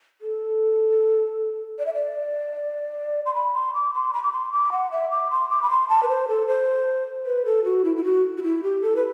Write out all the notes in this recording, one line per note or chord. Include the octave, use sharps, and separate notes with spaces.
A4
D5
E5
D5
C6
B5
C6
D6
C6
B5
D6
C6
D6
F#5
E5
D6
C6
D6
B5
C6
A5
B4
C5
A4
C5
B4
A4
F#4
E4
E4
F#4
F#4
E4
G4
A4
B4